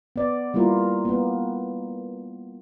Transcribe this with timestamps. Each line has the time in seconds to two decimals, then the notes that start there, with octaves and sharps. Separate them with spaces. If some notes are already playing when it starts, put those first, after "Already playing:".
0.16 B3 D5
0.54 G3 A#3 E4 F4 A#4
1.05 A#3 B3